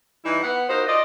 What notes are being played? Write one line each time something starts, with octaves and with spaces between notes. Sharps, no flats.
E3 G3 D#4 E4
B3 F#5
D#4 F4 F#4 A#4 C5
F4 D5 D#5